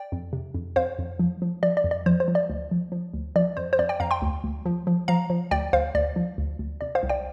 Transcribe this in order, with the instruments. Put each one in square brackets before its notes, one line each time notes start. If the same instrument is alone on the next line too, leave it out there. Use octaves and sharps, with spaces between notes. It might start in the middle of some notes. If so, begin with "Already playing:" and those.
Already playing: [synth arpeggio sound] D5 G5
F2
C3
F2
F2 C5 F5
F2
F3
F3
F3 D5
D5
F2
D5
F3 C5
C5
F3
D5
D2
F3
F3
D2
F3 D5
F2 C5
C5
F2 D5
D5 G5
F2 F5 A#5
G5 C6
D2
D2
F3
F3
F3 F5 A#5
F3
D2 D5 G5
D2 C5 F5
D2 D5
F3
D2
D2
C3 D5
C5 F5
C2
D5 G5